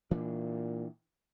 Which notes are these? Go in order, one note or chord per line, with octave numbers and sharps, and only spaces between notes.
A#2 E3 D4